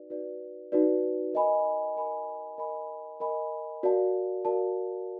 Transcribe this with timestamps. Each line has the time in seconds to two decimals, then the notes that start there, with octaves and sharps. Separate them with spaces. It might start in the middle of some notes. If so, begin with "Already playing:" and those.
Already playing: D#4 F#4 B4 D5
0.10 D#4 F#4 B4 D5
0.72 D#4 F#4 B4 D5
1.33 A#4 D#5 G#5 B5
1.97 A#4 D#5 G#5 B5
2.58 A#4 D#5 G#5 B5
3.20 A#4 D#5 G#5 B5
3.83 F#4 A#4 D5 F5 A5
4.45 F#4 A#4 D5 F5 A5